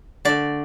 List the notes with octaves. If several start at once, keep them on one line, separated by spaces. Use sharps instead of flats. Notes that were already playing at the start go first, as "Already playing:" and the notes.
D3 A3 D5